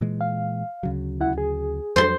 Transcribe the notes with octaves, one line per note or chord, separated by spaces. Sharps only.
A#2 E3 G#3
F5
D2 C#3 F#3
C#2 E4 F#5
G#4
F2 F#3 C5 C6